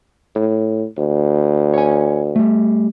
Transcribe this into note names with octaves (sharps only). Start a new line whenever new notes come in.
A2
D2
C#5 G#5
G3 A3